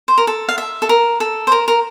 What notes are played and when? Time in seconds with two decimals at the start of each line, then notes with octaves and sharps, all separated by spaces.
0.08 C5
0.18 A#4
0.27 A4
0.49 F5
0.58 E5
0.82 A4
0.89 A#4
1.20 A4
1.47 C5
1.52 A#4
1.68 A#4